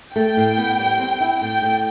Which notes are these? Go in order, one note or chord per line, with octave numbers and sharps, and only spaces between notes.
A3 G5
A2
B3
G3
C4
E4
A2 G5
A2